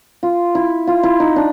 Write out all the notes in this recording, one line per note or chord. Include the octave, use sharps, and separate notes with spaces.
F4
E4
F4
E4
D#4
D4